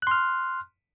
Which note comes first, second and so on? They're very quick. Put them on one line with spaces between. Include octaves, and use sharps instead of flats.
F#6 C6 F6